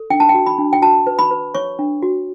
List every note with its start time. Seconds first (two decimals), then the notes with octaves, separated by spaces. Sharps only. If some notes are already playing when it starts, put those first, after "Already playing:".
Already playing: A4
0.10 D4 G5
0.20 A5
0.29 G5
0.34 F#4
0.46 B5
0.58 D4
0.73 G5
0.82 F#4 A5
1.07 B4
1.19 B5
1.31 B4
1.54 C#5 C#6
1.79 D4
2.03 F#4